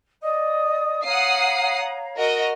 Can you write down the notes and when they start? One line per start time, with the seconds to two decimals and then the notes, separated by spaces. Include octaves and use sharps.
0.21 D5 D#5 D#6
1.04 C#5 F5 F#5 A#5 D#6 C7
2.18 F#4 A#4 D#5